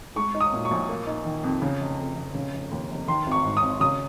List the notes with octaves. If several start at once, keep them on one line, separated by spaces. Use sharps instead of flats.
G#3 C#6
D#4
D#6
A#2
C#6
A#1
A#3
D#4
D#3
F2
C#3
F1
F2
F1
C#3
F1
D#2
F1
D#3 C6
G#1
C#6
G#2
D#6
G#1
C#3 D#6